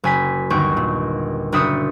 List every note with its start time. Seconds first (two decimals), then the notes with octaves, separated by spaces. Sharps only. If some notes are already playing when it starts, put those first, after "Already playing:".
0.04 F#1 G#5 B6
0.50 G1 D#2 C#6 G6
0.77 A#2
1.52 F#1 D4 E5 D#6 G6 C#7